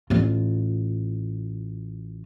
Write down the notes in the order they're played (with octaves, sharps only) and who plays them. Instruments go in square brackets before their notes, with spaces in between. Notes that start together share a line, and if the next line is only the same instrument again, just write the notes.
[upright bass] A1 F4